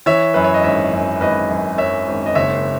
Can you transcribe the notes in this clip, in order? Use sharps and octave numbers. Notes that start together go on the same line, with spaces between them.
E3 C#5 E5
F#2 B4
C#5
D#5
G#1 C#5 E5
F#2
G#1 B4 D#5
F#2
F#2 C#5 E5
G#1
D#5
F#1 C#5 E5